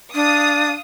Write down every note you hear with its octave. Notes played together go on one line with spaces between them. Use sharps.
D4 F5 D#6